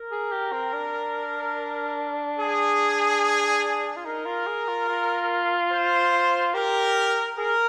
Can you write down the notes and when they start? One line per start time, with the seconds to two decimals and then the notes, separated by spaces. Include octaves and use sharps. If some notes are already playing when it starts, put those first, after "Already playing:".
Already playing: A#4
0.11 G#4
0.32 G4
0.52 C4
0.74 D4
2.39 G#4
3.97 F4
4.05 D#4 A#4
4.26 F4
4.47 G#4
4.68 F4
4.88 F4
5.71 C5
6.54 G4 A#4
7.38 G#4 A#4